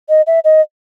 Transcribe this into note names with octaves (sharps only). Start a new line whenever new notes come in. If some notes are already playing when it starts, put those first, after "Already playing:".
D#5
E5
D#5